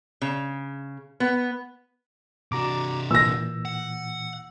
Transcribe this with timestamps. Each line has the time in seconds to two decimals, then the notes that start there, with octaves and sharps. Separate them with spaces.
0.22 C#3
1.20 B3
2.52 C3 D4 F#4 A#5 D6
3.11 A#2 E3 E6 A#6
3.65 F#5